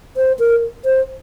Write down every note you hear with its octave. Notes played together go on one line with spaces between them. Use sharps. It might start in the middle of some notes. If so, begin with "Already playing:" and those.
C5
A#4
C5